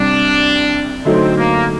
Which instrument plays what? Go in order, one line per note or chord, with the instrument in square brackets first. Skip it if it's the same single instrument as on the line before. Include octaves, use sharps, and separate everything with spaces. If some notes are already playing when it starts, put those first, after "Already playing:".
Already playing: [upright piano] C2 C3 G3 [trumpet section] D4
[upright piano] D3 F#3 A3 D#4 [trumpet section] C4
[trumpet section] A#3